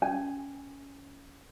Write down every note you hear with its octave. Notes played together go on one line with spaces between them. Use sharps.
C#4 G#5